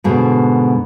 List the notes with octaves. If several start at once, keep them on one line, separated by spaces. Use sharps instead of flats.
G#2 B2 D3